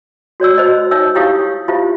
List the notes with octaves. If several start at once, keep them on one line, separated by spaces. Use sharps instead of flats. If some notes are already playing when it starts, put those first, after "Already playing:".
F#4 C#5 D5 E6
F#4 C5 D#5
D#4 C#5 E5 E6
E4 G4 C#5 F5 C#6 D#6
E4 F4 G4 C5 E5 F5